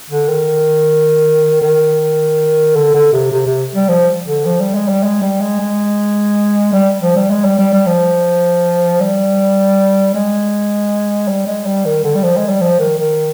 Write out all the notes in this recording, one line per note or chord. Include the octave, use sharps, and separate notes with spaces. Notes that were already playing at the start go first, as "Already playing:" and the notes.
D3
D#3
D#3
D3
D3
C3
C3
C3
G3
F3
D3
F3
G3
G#3
G3
G#3
G3
G#3
G#3
G3
F3
G3
G#3
G3
G3
G3
F3
G3
G#3
G3
G#3
G3
D#3
D3
G3
F3
G#3
G3
F3
D#3
D#3